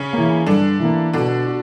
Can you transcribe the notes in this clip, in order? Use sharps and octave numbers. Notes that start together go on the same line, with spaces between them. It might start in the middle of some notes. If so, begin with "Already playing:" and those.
Already playing: C#3 C#4
E3 A#3
G2 D3 D4
E3 A#3
B2 D3 D4
F#4